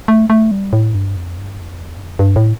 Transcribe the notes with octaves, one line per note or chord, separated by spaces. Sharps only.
A3
A3
G3
A2
G2
F2
G2
F2
E2
G2
F2
G2
A2